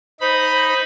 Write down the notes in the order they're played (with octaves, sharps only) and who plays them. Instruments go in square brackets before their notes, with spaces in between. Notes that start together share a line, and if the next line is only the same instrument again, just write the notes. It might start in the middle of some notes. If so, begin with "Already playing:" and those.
[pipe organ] D#4 B5 [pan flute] C5